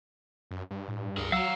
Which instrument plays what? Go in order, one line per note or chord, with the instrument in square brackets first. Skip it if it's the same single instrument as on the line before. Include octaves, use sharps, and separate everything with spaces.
[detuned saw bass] F#2
G2
[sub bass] A2
[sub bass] C#2 [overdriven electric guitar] G#4 A#4
[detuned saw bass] F#3 [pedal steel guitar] F5 E6 [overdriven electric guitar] F#5 A#5